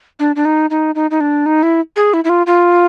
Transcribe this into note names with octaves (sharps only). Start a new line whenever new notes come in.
D4
D4
D#4
D#4
D#4
D#4
D4
D#4
E4
G#4
E4
E4
F4
F4